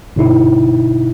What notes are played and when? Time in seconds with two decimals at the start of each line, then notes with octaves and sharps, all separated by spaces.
0.16 G1 B2 D#4 E4